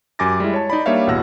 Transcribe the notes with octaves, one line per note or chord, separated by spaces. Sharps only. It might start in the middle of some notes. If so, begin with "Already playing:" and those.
F#2 G4 G#5 D6 A6 A#6
G3 G#3 E4
C#5 A5
D#4 D5 B5
G3 A#3 D4 C#5 E5 F5
A1 E2 B2 F#5 E6 A#6